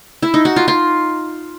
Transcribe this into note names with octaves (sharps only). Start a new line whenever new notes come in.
E4
D#4
F#4
F4
F4